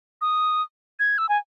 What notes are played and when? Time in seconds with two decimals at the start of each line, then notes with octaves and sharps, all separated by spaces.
0.21 D#6
0.99 G#6
1.18 E6
1.29 G#5